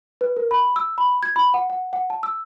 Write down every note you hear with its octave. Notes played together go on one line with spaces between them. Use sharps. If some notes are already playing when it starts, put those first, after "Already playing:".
B4
A#4
B5
E6
B5
G#6
B5
F#5
F#5
F#5
A5
E6